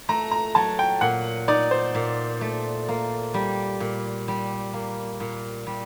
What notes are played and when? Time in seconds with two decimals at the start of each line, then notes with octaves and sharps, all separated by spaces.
0.09 A3 A#5
0.31 A#5
0.55 F#3 A5
0.79 G5
1.01 A#2 F#5
1.48 D#4 D5
1.71 C5
1.95 A#2
2.41 A3
2.88 A#3
3.34 G3
3.80 A#2
4.28 G3
4.73 A#3
5.20 A#2
5.67 G3